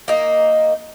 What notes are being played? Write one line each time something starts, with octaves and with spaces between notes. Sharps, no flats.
A#3 D#4